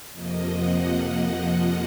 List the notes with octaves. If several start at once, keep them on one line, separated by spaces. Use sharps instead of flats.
F2 C3 F3 A#3 D#5
F#5